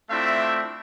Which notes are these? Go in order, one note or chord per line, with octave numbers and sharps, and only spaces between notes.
A3 C4 D4 E4 F4 E5